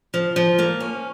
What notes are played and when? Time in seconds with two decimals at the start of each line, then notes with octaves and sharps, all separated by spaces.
0.14 F3
0.36 F3
0.59 A#3
0.80 C#4